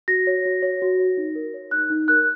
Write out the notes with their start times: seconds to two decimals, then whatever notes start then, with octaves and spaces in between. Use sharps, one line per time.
0.08 F#4 A#6
0.27 C#5
0.45 F#4
0.62 C#5
0.82 F#4
0.99 C#5
1.17 D#4
1.35 A#4
1.54 C#5
1.71 D#4 F#6
1.90 D#4
2.08 A#4 F#6